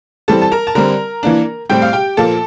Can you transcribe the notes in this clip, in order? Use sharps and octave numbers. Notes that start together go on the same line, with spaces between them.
E3 G3 C4 A4 A5
A5
A#4 A#5
A5
D3 G3 C4 A#4 A#5
E3 A#3 D4
A2 G3 C4 G4 G5
F5
G4 G5
A#2 F3 A#3 A4 A5